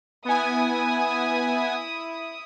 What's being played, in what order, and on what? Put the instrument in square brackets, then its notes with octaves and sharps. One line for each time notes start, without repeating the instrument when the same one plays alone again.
[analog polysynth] B3 G#5 [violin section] E4 D#6